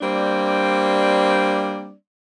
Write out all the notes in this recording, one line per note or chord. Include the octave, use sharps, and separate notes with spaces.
G3 A#3 C4 D4 D5